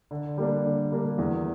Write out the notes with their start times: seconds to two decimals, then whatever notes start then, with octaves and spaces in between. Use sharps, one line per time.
0.11 D3
0.38 G3 A#3 D4
0.65 D3
0.92 G3 A#3 D4
1.18 E2